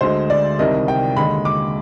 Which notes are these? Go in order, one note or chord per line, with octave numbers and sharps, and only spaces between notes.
D2 D3 G#3 C5
D5
C2 C3 D#3 G3 D#5
G5
D#2 D3 G#3 B5
D6